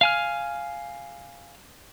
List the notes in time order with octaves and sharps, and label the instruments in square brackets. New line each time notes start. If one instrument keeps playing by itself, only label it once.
[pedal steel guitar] F5 G#5 F6